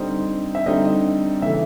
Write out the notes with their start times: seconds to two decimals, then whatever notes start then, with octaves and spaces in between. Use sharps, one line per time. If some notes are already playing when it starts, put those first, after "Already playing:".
Already playing: D3 G3 C4 D#4
0.55 E5
0.66 D3 G3 C4 D#4 D#5
1.42 C#3 E3 A3 E5